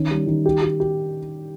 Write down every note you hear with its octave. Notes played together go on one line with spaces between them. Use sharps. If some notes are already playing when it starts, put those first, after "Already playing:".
Already playing: D#3 C#4
G3
D#3
G4
G4
G4